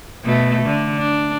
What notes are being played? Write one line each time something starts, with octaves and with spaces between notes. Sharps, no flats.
B2 A3
D3
D4